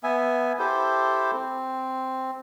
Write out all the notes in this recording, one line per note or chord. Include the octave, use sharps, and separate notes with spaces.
B3 E5 G#5
E4 G4 A4 C5
C4